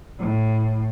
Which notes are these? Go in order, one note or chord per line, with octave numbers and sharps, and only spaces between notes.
A2